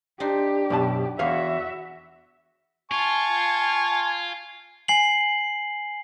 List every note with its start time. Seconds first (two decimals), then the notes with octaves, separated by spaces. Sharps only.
0.20 D4 D#4 G4 C5
0.70 F#2 B2 A5
1.19 E2 F#4 G#4 C#5 E5 F5
2.92 F4 G#5 A5 C#6
4.88 G#5 C7 F#7